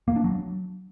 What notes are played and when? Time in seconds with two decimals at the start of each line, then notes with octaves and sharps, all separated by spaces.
0.08 A#3
0.16 D4
0.24 F#3